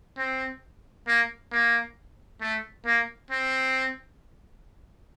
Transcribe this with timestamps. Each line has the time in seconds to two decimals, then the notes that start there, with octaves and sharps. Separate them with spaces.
0.18 C4
1.07 A#3
1.52 A#3
2.41 A3
2.86 A#3
3.31 C4